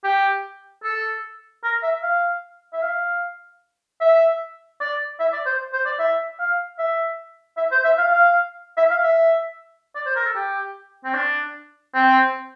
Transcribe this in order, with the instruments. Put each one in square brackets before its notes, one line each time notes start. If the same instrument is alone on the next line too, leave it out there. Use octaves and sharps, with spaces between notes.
[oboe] G4
A4
A#4
E5
F5
E5
F5
E5
D5
E5
D5
C5
C5
D5
E5
F5
E5
E5
C5
E5
F5
F5
E5
F5
E5
D5
C5
A#4
A4
G4
C4
D4
C4